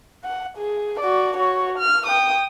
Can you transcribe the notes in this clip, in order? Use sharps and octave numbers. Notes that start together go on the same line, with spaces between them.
F#5
G#4
F#4 D5
F#4 C#5
F6
G5 D#6